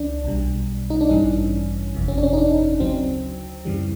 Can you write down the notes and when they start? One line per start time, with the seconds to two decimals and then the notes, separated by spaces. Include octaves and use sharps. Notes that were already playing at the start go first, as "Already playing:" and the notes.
Already playing: C#2 E3 D4
0.24 B1 B2 G3
0.90 D#4
1.01 D4
1.09 A1 G2 E3 G3 C#4
1.95 G1 F2 C3
2.08 C#4
2.18 D4
2.23 C#4
2.33 D#4
2.37 D4
2.80 D2 C#3 F#3 C4
3.65 F#2 C#3 E3 G3